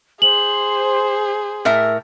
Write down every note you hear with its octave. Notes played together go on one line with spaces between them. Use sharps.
G#4 C5 F#7
A2 A#4 E5